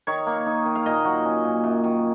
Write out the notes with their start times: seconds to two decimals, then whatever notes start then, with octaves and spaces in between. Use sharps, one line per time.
0.07 D#3 C#5
0.26 A#3
0.46 D#4
0.65 D#3
0.75 F5
0.85 A#2 D#5
1.05 F#3 F#4
1.25 C#4
1.44 A#2
1.64 F#2
1.84 D#3